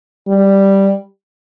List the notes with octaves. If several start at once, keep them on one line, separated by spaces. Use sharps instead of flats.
G3